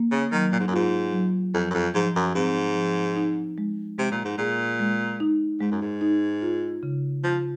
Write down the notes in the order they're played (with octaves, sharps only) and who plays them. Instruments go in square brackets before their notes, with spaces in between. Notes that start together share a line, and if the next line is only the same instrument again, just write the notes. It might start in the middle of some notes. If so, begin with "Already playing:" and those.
Already playing: [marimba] A#3
[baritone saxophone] C#3
[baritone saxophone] D#3 [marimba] F#3
[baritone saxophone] A#2
G#2
F#2
[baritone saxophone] G#2 [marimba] F4
[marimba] F#3
[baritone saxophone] F2 [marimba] F3
[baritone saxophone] F#2
F2
[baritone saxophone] G#2 [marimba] F3
[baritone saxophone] F#2
[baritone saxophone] G#2 [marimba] C4
[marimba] F3
D#4
G#3
[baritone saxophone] C3 [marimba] G#3
[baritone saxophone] A#2
G#2
[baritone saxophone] A#2 [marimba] G#4
[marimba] G#3
D#4
[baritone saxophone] G#2 [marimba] G#3
[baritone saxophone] F#2
G#2
[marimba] D#4
F4
C#3
[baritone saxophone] F3 [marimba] F4